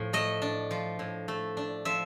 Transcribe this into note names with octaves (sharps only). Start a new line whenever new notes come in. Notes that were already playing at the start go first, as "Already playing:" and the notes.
Already playing: A2 F3
A3 D#5
D4
F3
A2
A3
D4
F3 E5